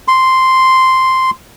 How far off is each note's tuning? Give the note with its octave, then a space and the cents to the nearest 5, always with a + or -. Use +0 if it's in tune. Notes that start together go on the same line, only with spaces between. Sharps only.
C6 -5